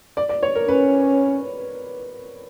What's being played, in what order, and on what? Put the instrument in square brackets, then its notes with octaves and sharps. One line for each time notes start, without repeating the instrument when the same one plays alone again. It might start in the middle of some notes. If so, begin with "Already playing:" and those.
[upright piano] D5
D5
C#5
A#4
[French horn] C#4 [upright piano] B4